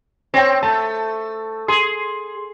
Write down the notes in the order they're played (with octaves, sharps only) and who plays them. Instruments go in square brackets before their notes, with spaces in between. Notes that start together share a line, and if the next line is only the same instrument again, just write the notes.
[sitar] C4 [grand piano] C#5 G5
[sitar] A3 [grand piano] A5
[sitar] G#4 [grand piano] C6